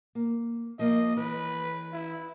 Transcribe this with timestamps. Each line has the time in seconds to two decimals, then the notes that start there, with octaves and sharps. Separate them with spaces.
0.15 A#3
0.79 F3 A#3 D#5
1.17 E3 B4
1.93 E4